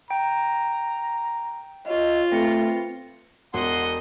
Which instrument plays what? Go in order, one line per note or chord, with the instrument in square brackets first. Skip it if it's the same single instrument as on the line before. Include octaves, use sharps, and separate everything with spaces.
[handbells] G5 [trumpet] A#5
[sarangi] F4 [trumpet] C#5 [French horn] D#5
[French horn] A3 [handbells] C4 A#6 C#7 [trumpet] B4
[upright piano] E1 [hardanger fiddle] D#5 [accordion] F#5 C6